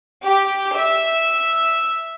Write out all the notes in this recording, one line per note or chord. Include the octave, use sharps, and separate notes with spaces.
G4
E5